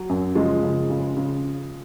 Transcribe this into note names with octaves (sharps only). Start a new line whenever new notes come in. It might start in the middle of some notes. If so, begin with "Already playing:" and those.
Already playing: F#3
F#2
C#3 F3 G#3
F#1
C#3
C#3